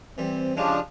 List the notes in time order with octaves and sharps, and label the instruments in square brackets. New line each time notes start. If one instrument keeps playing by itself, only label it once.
[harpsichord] E3 G3 [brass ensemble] C4
[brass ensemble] C#3 [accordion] F3 D4 [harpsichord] G#3 F4 G4